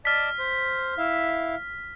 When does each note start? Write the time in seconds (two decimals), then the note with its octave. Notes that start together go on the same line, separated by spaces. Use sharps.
0.05 D5 D#5 A5 F6 B6
0.39 C5
0.98 E4 E5 F5